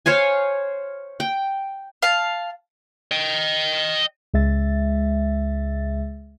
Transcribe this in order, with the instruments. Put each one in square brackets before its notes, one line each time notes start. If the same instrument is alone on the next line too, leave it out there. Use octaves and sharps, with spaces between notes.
[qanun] C5 C#5 F5 G#5
G5
[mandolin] F5 A5
[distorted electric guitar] D#5 G5
[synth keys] C#2 G#3 E5 A6